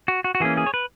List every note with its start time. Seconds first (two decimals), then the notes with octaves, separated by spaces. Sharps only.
0.08 F#4
0.24 F#4
0.35 F#4
0.40 E3 A#3 C#4 G#4
0.57 G#4
0.66 C#5
0.74 B4